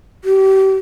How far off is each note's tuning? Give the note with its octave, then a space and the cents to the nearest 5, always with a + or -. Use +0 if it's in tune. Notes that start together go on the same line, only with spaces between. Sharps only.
G4 -30